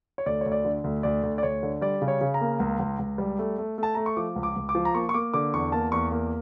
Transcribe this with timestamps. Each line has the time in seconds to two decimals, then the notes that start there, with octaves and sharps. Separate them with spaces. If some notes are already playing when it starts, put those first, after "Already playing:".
0.18 C#5
0.26 D2 D5
0.41 D2 C#5
0.52 D5
0.65 D3
0.84 D2
1.03 D2 D5
1.23 D2
1.38 D5
1.43 D2 C#5
1.63 D3
1.81 G3 D5
2.02 C#3
2.08 C#5
2.21 C#3
2.34 A#5
2.41 A#3
2.60 C#2
2.79 C#2
2.99 C#2
3.18 G3
3.39 A3
3.58 A3
3.78 A3 A5
3.95 A3 A#5
4.06 C#6
4.17 F3 D6
4.36 C#2
4.43 D6
4.56 C#2
4.69 D6
4.75 F3
4.85 A#5
4.95 A#3 C#6
5.09 C#6
5.14 A#3 D6
5.33 D3 D6
5.54 E2 C#6
5.72 A#3 A5
5.92 E2 C#6
6.11 A#3